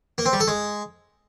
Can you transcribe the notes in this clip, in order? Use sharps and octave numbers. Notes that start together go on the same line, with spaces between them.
A#3
C4
G3
A4
G#3